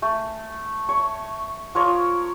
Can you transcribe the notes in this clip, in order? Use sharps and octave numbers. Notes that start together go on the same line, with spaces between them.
A3
C#5
F3 A#4 C#5